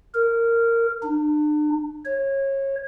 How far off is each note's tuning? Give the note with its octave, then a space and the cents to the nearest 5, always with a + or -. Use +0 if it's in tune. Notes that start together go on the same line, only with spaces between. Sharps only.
A#4 -15
D4 +40
C#5 -25